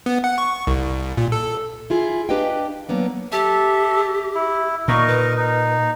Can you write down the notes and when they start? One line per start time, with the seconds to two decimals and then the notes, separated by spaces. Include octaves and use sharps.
0.06 B3
0.24 F#5
0.38 C#6
0.67 C2
1.17 A#2
1.32 A4
1.90 E4 F4 G#4
2.29 D4 G4 B4 D#5 F5 G5
2.89 F#3 A#3 B3 D4
3.32 G4 A4 E5
4.35 E4
4.88 A#2 D#4 A#4 D#5 C#6
5.08 B4
5.37 D#4